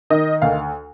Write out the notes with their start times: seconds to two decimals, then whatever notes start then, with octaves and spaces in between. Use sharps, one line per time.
0.10 D#3 D#5
0.42 D2 F5